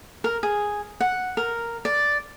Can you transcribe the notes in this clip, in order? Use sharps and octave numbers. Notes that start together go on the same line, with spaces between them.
A#4
G#4
F#5
A#4
D5